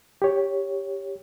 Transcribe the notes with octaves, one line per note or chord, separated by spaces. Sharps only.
G4 C#5